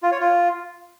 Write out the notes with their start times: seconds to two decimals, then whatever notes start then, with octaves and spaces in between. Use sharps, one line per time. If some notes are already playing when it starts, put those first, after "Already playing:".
0.03 F4
0.12 C#5
0.20 F4